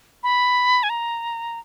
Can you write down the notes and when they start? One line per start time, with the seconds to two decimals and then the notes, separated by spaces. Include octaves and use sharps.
0.23 B5
0.83 G#5
0.90 A#5